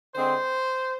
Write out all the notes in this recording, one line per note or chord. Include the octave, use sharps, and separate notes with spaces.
D3 G#3 C4 C5